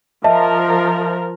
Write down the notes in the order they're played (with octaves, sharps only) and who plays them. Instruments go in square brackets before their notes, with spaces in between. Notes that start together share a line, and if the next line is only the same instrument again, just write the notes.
[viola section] F3 A#4 [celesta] D#5 E5 A5